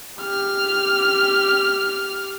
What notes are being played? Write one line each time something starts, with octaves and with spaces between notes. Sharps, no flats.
G4 F6